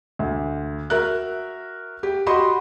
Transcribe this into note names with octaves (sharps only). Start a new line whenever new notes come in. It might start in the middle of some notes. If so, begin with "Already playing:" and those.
D2
F#4 A#4 E5 F#6
G4
F#4 G4 D#5 B5 C6